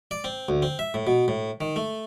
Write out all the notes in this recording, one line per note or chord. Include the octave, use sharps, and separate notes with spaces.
D5
C4
D2
C4
E5
A2
B2
A2
D#3
A3